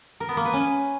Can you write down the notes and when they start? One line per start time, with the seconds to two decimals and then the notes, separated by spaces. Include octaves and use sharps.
0.20 A#4
0.29 B3
0.37 A#3
0.45 B4
0.53 C#4